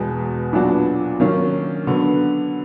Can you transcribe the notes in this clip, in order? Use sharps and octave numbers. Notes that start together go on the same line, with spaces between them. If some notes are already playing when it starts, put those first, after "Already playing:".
Already playing: E2 B2 G#3
A#2 F#3 B3 D4 F#4
D#3 F#3 A#3 C#4
D3 F#3 B3